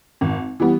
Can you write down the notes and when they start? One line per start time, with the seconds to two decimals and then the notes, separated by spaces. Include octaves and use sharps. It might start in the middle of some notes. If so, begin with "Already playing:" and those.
0.21 G#1
0.60 E3 G3 B3